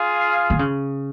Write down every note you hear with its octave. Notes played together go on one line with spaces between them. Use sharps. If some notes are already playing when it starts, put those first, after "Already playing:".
Already playing: F4 G#4 F5
D#3
C#3